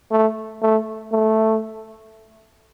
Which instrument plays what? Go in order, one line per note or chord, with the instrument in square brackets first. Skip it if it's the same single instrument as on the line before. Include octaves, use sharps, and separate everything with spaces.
[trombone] A3
A3
A3